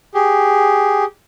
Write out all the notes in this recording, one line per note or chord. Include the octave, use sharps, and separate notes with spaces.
G4 G#4